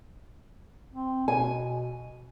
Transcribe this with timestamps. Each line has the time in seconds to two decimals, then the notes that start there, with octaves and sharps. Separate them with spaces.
0.93 C4
1.28 B2 G#5